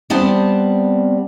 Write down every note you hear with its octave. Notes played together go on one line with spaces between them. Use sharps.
G3 B3 C4 D5 A5